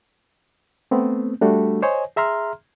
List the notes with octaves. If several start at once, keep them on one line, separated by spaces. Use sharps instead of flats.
A3 B3 C4
G3 A3 D4 F#4 A4
C5 C#5 D#5 G#5
G#4 E5 A#5 C6 F6